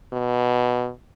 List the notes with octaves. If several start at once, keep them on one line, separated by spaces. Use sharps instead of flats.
B2